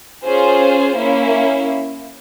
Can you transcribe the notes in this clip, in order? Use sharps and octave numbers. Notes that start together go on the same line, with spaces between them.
C#4 F4 G#4 C5
A#3 C#4 E4